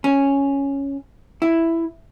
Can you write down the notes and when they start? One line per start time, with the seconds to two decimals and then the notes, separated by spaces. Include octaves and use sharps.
0.04 C#4
1.42 E4